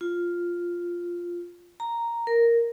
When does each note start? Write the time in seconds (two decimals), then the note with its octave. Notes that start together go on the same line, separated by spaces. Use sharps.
0.01 F4
1.80 A#5
2.27 A#4